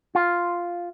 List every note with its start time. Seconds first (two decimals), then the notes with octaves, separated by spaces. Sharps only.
0.15 F4